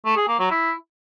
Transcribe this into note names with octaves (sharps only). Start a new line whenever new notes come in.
A3
G#4
A#3
F#3
E4